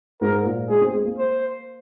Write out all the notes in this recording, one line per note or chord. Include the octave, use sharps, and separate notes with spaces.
G#2 A#4
A#2
G#3 G#4
C4
G#3
A#3
C5